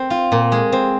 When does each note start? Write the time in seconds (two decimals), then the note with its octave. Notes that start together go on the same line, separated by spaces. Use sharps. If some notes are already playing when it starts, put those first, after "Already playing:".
Already playing: C4
0.10 F4
0.32 A#2
0.52 G#3
0.72 C4